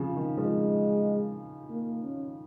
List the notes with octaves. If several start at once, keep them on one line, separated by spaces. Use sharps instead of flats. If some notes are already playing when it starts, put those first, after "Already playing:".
Already playing: C#3 F3
D#3
F3 G#3
A#3
C#4